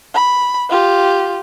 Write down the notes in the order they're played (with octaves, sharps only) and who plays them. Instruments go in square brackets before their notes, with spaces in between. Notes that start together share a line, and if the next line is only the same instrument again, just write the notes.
[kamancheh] B5
F4 G4